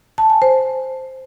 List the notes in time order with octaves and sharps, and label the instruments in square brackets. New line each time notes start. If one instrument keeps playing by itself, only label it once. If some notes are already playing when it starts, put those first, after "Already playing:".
[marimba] A5
G#5
C5